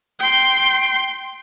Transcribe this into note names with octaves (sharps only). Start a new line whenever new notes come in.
G5 C6